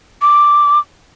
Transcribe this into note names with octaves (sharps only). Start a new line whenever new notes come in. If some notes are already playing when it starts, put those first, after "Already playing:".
D6